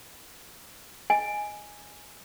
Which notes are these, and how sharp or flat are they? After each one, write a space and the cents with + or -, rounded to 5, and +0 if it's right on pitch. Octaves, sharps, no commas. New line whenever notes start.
D#5 +0 G#5 +0